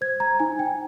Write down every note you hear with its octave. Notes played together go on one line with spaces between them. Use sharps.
C5 G#6
A#5
D#4 G#5
G5